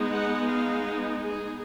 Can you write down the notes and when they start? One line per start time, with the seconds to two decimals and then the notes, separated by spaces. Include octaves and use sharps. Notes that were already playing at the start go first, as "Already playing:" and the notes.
Already playing: G#3 B3 D#4
0.09 F#5
0.46 F5
1.21 G#4